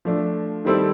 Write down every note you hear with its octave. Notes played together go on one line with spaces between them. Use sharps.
F3 A3 D4
D#3 G3 C4 E4 A4